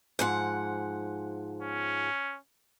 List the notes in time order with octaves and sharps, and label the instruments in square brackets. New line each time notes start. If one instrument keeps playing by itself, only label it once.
[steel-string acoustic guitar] G#2 F3 F#5
[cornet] C#4